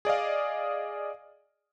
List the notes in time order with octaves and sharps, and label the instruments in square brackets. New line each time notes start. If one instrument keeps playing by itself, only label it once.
[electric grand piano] G#4 D5 D#5 F5